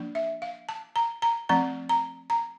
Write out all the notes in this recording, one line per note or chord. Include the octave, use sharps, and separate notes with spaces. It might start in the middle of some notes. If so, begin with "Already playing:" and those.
Already playing: F3 A#3 D4
E5
F5
A5
A#5
A#5
F3 A3 C4 A#5
A#5
A#5